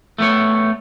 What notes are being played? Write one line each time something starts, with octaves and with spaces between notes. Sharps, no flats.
A3 B3 C#5